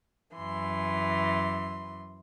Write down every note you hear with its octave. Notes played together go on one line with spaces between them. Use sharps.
F#2 E3 C6